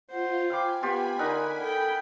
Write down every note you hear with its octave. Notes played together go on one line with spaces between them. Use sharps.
F4 C5 F#5
F5 G5 G#5 B5 D6
B3 F4 G4 G#5 B5
D3 D#4 A#4 F#5
A4 G5